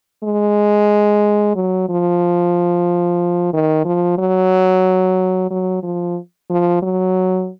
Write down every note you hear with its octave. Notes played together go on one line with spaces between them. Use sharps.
G#3
F#3
F3
D#3
F3
F#3
F#3
F3
F3
F#3